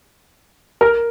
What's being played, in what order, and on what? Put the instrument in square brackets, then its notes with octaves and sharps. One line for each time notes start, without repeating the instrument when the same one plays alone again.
[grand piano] A#4